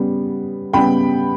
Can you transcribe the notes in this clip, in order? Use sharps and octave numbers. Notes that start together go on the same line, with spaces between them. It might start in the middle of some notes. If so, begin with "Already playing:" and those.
Already playing: C#3 G3 B3
C#3 G3 B3 G5 B5